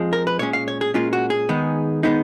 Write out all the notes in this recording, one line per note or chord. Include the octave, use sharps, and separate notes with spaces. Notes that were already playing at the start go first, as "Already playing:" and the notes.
Already playing: F2 F3 G#3
A#4
B4
A#2 G#3 C#4 C#5
F5
C#5
G#4
A#2 G#3 C#4 F4
F#4
G#4
D#3 G#3 B3 D#4
D#3 G#3 B3 D#4